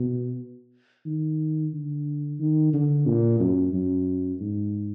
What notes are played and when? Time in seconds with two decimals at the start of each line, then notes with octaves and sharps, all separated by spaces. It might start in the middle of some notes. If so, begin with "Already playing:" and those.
Already playing: B2
1.06 D#3
1.74 D3
2.40 D#3
2.73 D3
3.07 A#2
3.40 F#2
3.73 F#2
4.41 G#2